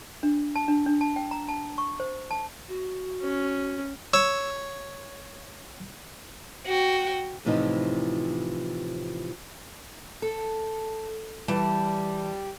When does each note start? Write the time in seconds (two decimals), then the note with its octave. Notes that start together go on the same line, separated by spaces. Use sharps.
0.23 D4
0.56 A5
0.68 D4
0.86 D4
1.01 A5
1.16 G5
1.31 A#5
1.48 A5
1.78 C#6
2.00 C5
2.31 A5
2.68 F#4
3.23 C#4
4.14 C#5 E6
6.66 F#4 G5
7.45 A2 C3 E3 F3 D#4
10.22 A4
11.48 E3 G3 A5